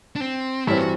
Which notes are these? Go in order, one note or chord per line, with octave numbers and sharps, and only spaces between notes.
D4
C4
G2 E3 G3 C4 E4
F#4